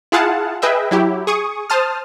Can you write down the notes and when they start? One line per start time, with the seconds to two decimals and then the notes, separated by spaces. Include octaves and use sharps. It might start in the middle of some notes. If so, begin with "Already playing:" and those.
0.12 E4 F4 G#4 F5 F#5 A5
0.62 G#4 B4 D#5 E5 G5
0.91 F#3 E4 G4
1.27 G#4 C#6 D#6
1.70 C5 A5 D#6 F6